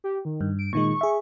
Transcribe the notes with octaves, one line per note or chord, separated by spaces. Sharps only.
G4
D#3
G2
D7
A#2 D#3 G#3 C#6
G#4 E5